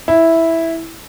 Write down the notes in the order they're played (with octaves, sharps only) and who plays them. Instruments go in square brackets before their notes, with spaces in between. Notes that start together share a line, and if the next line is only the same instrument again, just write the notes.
[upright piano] E4